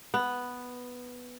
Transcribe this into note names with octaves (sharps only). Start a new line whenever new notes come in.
B3